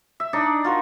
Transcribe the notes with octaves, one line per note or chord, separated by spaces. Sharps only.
E5
D4 D#4 D5
F4 F#4 A#4